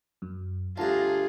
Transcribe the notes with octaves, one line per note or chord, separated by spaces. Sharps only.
F#2
D2 G2 F4 G#4 A5 A#5